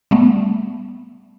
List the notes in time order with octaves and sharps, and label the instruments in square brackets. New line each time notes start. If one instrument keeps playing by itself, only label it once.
[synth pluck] G3 A3 B3